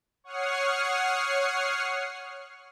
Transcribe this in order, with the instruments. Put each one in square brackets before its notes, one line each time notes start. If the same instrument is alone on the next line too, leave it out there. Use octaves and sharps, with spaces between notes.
[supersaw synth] C#5 F#5 C#6 D#6 F6 C7